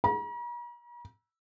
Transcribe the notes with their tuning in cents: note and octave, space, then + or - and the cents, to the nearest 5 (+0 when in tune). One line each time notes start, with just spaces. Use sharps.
A#5 +45